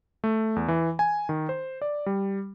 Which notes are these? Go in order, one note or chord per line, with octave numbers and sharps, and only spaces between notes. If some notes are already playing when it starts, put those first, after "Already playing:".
A3
E2
E3
G#5
D#3
C5
D5
G3